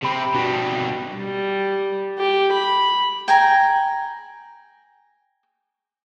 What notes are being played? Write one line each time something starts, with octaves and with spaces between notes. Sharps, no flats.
C3 C4 G4 B5
B2 G3 C4 D4 F#4
G3
G4
B5
G5 G#5 A#5